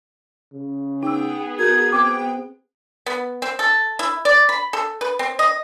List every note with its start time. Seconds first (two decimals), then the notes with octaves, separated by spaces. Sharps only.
0.53 C#3
1.03 B3 D#4 G#4 G5 E6
1.59 F#4 A#4 G6 G#6
1.92 C4 G5 D6 G#6
3.06 B3
3.42 C4
3.59 A4
3.99 E4
4.25 D5
4.49 B5
4.73 A4
5.01 B4
5.19 C4
5.39 D#5